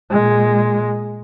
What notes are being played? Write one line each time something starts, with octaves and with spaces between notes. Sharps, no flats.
A#2 G#3